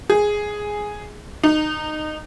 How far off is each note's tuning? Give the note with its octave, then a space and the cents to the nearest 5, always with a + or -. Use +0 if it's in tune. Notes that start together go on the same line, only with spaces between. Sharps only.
G#4 +0
D#4 -20